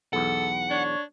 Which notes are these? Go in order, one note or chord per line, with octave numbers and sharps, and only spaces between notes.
B1 E2 A4 F#5
D4 C#5